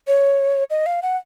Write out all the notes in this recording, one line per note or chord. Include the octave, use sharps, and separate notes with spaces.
C#5
D#5
F5
F#5